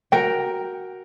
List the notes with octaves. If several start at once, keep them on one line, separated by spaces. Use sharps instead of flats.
F#4 A#4 G5